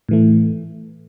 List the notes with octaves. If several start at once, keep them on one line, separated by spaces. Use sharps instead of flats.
A2 E3 A3